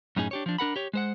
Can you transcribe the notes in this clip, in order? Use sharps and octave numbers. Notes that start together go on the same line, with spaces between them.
F#2 A2 C#4 D#4 G#4
D4 G4 C#5
F3 D4
D4 A#4 F#5 B5
G4 C#5
G#3 C5 F#5